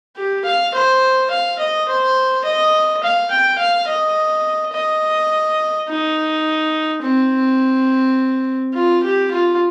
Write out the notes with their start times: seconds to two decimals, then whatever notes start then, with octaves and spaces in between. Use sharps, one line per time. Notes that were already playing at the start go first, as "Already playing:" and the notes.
0.16 G4
0.44 F5
0.74 C5
1.30 F5
1.58 D#5
1.88 C5
2.44 D#5
3.02 F5
3.30 G5
3.58 F5
3.87 D#5
4.73 D#5
5.88 D#4
7.02 C4
8.73 F4
9.03 G4
9.31 F4